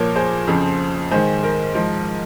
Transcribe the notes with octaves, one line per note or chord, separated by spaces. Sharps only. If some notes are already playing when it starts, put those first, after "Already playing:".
Already playing: A#2 F3 A#4 C#5
G#4 C5
F2 C#3 F3
G#2 D#3 G#4 C5
A#4
G#2 F3